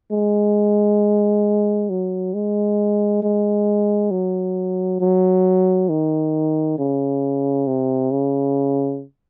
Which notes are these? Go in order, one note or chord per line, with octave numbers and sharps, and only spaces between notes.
G#3
F#3
G#3
G#3
F#3
F#3
D#3
C#3
C3
C#3